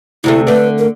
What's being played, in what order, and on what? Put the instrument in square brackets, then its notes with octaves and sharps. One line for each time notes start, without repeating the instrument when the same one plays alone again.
[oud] D2 C3 A3 [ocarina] E4
[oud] D3 A3 [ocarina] B4
[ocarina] A#4